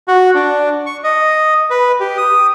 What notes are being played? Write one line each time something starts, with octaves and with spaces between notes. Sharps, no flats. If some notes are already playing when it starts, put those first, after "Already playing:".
F#4
D4
C#6
D#5
B4
G4
D#6